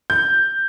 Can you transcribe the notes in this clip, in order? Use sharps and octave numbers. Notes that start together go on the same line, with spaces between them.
G6